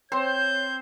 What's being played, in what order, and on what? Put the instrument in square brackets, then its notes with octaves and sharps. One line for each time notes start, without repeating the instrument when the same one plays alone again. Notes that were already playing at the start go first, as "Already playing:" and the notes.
[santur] C4 [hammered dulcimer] C5 [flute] C#5 [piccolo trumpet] G6